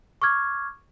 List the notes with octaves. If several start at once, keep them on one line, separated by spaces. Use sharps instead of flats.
C#6 D6 F6 G#6